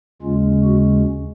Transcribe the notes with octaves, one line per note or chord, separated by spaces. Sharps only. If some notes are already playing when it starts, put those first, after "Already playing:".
D#2 C#3 G#3 C#4 F4
F#4